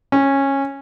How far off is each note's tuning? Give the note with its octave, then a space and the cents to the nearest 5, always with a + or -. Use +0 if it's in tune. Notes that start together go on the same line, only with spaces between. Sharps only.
C#4 -15